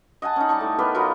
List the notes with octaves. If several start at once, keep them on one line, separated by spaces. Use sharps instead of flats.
D#5 F#5 G#5 A5
C#4 D#4
G3 A5 C#6
A2
B3 G4 A#4 B4
F#3 B3 F4 A#4